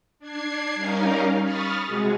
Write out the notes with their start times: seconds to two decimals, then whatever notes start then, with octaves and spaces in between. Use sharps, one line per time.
0.19 D4 G#6 C7
0.75 G3 C#4 D#4 A#4 F5
1.41 B5 C#6 D#6 F6 A6
1.85 C3 G#3 F#4 G#4